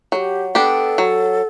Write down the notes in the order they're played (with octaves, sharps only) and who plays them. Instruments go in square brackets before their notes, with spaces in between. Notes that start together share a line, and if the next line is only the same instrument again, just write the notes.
[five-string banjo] F#3 [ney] A4
[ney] G4
[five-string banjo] B3 D4 G4 [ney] A4
[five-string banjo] F#3